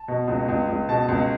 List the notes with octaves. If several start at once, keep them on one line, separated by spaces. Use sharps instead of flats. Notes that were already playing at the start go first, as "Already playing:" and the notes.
Already playing: A5
B2
C#2
C#2
C#2
B2 A5
C#2